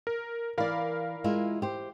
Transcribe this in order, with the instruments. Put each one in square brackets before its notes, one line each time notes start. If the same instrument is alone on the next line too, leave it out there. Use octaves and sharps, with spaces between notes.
[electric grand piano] A#4
[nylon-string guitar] E3 D5 [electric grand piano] A#4 F5 B5
[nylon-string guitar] G#3 E4 F4
G4 C5